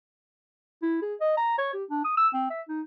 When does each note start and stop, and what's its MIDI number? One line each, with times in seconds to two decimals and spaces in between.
0.82 0.98 64
1.02 1.15 68
1.21 1.34 75
1.37 1.58 82
1.58 1.70 73
1.74 1.84 67
1.90 2.04 62
2.05 2.14 87
2.17 2.28 88
2.34 2.49 60
2.50 2.62 76
2.69 2.81 63